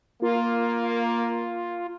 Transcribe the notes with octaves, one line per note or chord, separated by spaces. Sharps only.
A#3 F4